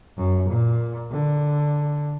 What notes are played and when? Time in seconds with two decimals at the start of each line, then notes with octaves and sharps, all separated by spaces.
0.17 F#2
0.50 A#2
1.12 D3